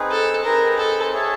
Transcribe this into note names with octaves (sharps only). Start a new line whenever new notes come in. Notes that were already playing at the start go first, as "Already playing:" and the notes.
Already playing: C4 D#4 G#4 B4
A4
C4 D#4 G#4 A#4 B4
A4
G#4 C#5 E5 A5